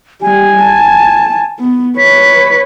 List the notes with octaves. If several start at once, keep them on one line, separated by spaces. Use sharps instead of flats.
G3 G4 G#5
A5
B3
B4 C#5 B6